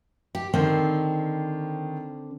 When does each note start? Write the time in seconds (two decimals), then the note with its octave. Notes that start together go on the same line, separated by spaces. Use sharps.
0.35 G4
0.54 D3 D#3 C4